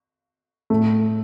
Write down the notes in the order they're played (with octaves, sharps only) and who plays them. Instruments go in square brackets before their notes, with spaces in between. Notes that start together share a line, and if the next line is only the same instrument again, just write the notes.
[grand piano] A2 A3